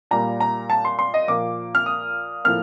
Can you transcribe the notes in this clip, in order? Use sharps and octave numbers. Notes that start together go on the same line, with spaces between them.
A#2 G3 A#3 A#5
A#5
A5
C6
C6
D#5
A#2 F3 A#3 D6
F6
D#6
A2 F3 A#3 F6